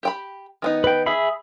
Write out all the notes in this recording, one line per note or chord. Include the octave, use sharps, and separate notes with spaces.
G4 G5 B5
D#3 B3 D#4
B4 G5
G#4 E5 B5